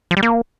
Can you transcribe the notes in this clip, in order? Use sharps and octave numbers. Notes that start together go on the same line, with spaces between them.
F3
G3
A#3